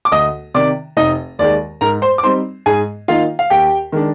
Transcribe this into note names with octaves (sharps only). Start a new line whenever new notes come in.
D6
D2 D#5 D#6
C3 D#3 D5 D6
F1 D#4 D#5
D#2 D#3 G#3 D5
G#2 A#4 A#5
C5 C6
D6
G3 C4 D#4 C5 C6
G#2 G#4 G#5
D#3 A#3 D#4 F4 F5
F5
D#2 G4 G5
D#3 G#3 D4